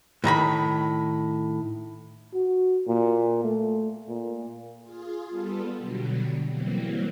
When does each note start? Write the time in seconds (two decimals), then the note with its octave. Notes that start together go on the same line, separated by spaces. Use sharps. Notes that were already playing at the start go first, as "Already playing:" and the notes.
0.24 A2 D#3 A#5 B5
2.34 F#4
2.87 A#2
3.44 A3
4.09 A#2
4.82 F4 G#4
5.30 G3 B3 F4 A4
5.76 B2 D3 F#3 G3
6.49 E3 F#3 G3 A#3 C4